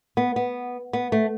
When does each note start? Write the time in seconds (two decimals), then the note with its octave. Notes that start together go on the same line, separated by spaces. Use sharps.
0.17 B3
0.36 B3
0.93 B3
1.12 A3